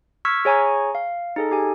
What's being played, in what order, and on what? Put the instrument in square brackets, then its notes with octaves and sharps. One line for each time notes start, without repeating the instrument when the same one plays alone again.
[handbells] C#6 E6 F6 G#6 B6
G#4 C#5 G#5 A#5 C#6
F5
D#4 G#4 A4
G4 G#5